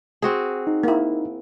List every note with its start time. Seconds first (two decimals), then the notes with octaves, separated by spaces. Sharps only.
0.22 C4 F#4 G#4
0.67 D#4
0.83 A#3 E4